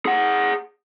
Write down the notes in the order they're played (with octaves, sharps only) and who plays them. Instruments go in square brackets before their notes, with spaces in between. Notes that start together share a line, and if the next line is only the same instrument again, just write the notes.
[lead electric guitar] G#4 F#5